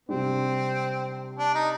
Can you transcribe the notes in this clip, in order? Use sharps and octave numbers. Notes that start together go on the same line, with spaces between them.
C3 G3 C4 D4
D4
D#4